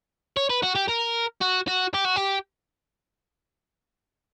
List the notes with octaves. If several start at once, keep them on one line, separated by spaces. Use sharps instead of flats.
C#5
B4
F#4
G4
A#4
F#4
F#4
G4
F#4
G4